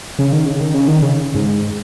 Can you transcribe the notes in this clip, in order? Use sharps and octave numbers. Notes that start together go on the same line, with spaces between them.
C#3
D#3
C#3
D#3
C#3
D#3
C#3
G#2